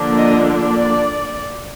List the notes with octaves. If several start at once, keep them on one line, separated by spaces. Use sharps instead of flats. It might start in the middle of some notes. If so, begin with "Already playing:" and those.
Already playing: D3 F3 A#3 D4
D#5
D5